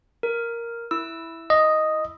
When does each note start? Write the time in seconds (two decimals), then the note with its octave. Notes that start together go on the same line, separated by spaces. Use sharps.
0.23 A#4
0.91 E4 E6
1.50 D#5